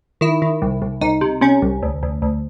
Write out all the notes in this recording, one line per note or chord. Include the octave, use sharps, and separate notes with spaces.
D#3 E4
D#3
C2
C2
C2 D#4
C3
C3 C#4
C2
D2
D2
D2